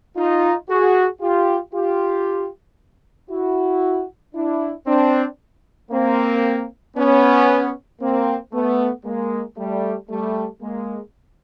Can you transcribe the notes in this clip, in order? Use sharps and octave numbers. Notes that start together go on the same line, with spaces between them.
D#4 F4
F#4 G#4
F4 G4
F4 G4
E4 F#4
D4 E4
C4 D4
A#3 C4
B3 C#4
A#3 C4
A3 B3
G#3 A#3
G3 A3
G3 A3
G#3 A#3